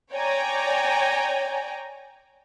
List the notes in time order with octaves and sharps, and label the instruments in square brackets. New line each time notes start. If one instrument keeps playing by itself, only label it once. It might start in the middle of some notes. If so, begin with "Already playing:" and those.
[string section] C#5 D5 G5 G#5 A#5